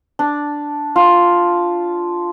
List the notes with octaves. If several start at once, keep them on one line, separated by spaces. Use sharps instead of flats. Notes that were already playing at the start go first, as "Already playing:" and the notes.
D4
F4